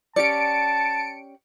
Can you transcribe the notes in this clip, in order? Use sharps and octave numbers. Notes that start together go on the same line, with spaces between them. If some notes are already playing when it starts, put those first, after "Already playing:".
C#4 G4 D5 A5 C#7 D7